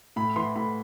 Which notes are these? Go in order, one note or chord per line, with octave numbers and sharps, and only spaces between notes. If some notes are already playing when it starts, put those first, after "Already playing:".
A2 B5
E3 C6
A2 B5